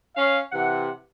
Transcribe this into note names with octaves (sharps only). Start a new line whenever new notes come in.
C#4 F5
C3 E3 F#5